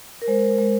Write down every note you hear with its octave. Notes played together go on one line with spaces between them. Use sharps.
A#4
G#3 C5
G#3